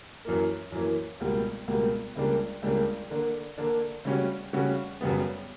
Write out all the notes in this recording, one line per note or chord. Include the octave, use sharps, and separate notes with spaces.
F#2 E3 A#3
F#2 E3 A#3
C#2 B2 G3 A#3
C#2 B2 G3 A#3
C#2 C#3 G3 A#3 D4
C#2 C#3 G3 A#3 D4
D3 A#3 D4
D3 A#3 D4
C#3 G3 C#4 F#4
C#3 G3 C#4 F#4
F#2 C#3 G3 B3